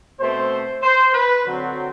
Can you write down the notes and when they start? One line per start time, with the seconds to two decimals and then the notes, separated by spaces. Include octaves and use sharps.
0.21 B2 A3 C4 C5
0.83 C5
1.14 B4
1.46 D3 F#3 C4